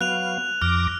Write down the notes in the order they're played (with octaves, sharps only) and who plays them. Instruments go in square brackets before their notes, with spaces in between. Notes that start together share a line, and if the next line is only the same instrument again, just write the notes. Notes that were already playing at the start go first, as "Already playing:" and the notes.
[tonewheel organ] F#3 B3 F5 [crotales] F#6 F7
[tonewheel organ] F2 D6 A#6 [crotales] F6